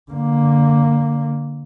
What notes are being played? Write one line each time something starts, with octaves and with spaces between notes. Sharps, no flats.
D3 A#3